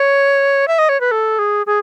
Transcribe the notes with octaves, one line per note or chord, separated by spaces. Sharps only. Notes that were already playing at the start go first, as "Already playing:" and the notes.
Already playing: C#5
E5
D#5
C#5
B4
A4
G#4
G#4